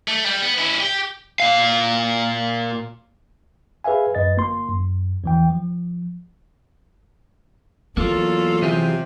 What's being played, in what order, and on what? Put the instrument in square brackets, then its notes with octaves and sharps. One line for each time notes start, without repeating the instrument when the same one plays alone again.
[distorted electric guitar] A3
G3
B3
C#4 E4
G4
[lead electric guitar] A#2 F5
[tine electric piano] G#4 B4 E5 F5 G#5
F#2 B4 D#5 A6
G1 A#3 C6
F#2
E2 E3 G5
F3
[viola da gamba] E2 F#3 F4 [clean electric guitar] A#3 [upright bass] B3 [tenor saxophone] A4
[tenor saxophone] C3 [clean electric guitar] E3 G4 G#4